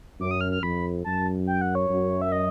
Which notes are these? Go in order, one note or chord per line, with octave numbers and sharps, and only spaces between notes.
F#2 D6
D#6
F6
F6
F2 B5
F#2 A5
G5
F#5
C#5
F#2
E5
D#5